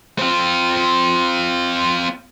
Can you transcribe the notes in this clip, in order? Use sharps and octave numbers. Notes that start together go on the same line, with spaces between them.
C4 F4